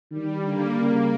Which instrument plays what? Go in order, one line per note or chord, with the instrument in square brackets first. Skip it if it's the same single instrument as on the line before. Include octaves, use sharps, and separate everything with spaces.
[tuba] D#3 [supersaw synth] G3
[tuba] D3 [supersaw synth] A#3
[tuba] C#3 [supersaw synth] A#3